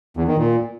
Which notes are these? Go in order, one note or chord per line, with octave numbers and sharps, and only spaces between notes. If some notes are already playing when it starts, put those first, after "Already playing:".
E2
D#3
A#2